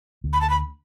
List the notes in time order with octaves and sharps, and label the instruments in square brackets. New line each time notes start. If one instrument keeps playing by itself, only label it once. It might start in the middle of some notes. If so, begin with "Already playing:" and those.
[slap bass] D2
[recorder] B5
A5
B5